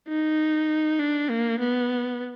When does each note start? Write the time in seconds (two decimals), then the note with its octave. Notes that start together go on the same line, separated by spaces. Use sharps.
0.09 D#4
0.99 D4
1.30 A#3
1.59 B3